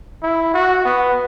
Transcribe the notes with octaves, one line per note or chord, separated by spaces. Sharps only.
E4
F#4
B3